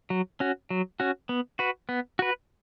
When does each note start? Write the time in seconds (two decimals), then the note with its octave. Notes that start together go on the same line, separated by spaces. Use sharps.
0.10 F#3
0.40 C#4 F#4
0.70 F#3
1.00 C#4 F#4
1.29 B3
1.59 F#4 B4
1.89 B3
2.19 F#4 B4